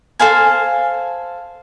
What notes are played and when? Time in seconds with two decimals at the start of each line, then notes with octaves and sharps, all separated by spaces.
0.19 A4 C5 F5 G#5